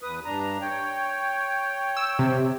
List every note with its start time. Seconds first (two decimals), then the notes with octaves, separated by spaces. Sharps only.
0.03 E2 B4 D#6
0.25 G2 D4 A#5
0.61 C#5 G5
1.97 E6
2.19 C3